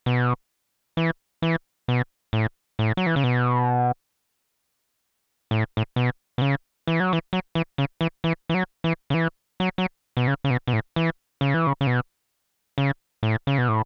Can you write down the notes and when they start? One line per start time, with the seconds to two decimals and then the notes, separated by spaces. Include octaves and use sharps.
0.06 B2
0.97 E3
1.42 E3
1.88 B2
2.33 A2
2.79 A2
2.97 F#3
3.06 E3
3.16 C#3
3.24 B2
5.51 A2
5.77 A2
5.96 B2
6.38 B2
6.42 C#3
6.87 E3
7.00 F#3
7.13 E3
7.33 F#3
7.55 E3
7.78 C#3
8.01 E3
8.24 E3
8.49 E3
8.54 F#3
8.84 E3
9.10 C#3
9.14 E3
9.60 F#3
9.78 F#3
10.17 B2
10.27 C#3
10.44 C#3
10.50 B2
10.67 B2
10.73 A2
10.96 E3
11.41 C#3
11.54 E3
11.67 C#3
11.81 C#3
11.87 B2
12.78 C#3
13.23 A2
13.47 C#3
13.58 B2
13.68 A2